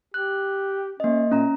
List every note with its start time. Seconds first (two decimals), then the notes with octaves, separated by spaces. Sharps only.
0.14 G4 F#6
1.00 A#3 C#4 D#5
1.31 A#2 C#4 A#5